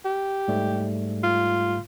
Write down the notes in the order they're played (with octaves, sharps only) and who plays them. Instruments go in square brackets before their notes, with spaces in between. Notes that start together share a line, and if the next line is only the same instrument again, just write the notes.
[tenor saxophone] G4
[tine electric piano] G#2 G3 A3
[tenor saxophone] F4